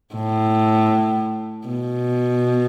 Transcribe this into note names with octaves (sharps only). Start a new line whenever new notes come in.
A2
B2